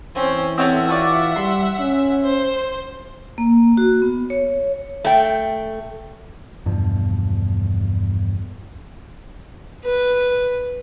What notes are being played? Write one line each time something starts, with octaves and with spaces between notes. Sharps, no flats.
E3 C4 C#4
C4 C#4 A4 E5 F#5
F4 F#4 D5
G3 C6
C#4
C5
A#3
F#4
B3
C#5
A3 G5
E2 G2 B2 F3
B4